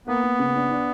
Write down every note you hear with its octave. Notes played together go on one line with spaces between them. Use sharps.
A#3 B3
A#3
C#3
D4
D4